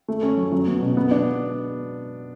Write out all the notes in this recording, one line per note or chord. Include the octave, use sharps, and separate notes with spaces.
A3
C#4
F#3
F#3
B3
B2
B3
D4